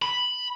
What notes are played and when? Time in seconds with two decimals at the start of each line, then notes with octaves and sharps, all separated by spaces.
0.02 B5